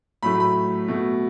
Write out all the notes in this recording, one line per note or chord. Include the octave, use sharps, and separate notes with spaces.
A2 F#3 A3 B5
B5
B2 A3